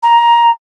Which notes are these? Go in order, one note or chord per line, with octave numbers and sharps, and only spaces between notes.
A#5